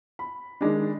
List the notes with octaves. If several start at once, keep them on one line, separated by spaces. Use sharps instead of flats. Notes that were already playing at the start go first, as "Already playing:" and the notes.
B5
D#3 G#3 D4